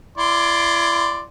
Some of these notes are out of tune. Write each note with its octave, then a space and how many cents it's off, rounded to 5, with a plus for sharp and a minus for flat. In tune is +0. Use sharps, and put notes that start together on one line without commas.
E4 +35 D5 +0 C6 +0